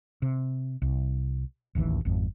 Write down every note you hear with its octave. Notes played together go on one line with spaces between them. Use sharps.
C3
C2
D1 A1 D#2 E3
G#1 F2